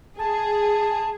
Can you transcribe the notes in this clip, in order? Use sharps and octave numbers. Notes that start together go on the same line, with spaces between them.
G#4 A5